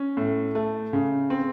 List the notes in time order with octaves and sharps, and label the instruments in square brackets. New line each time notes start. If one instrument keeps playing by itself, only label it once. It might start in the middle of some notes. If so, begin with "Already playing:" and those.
Already playing: [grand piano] C#4
A2
A3
C#3
C4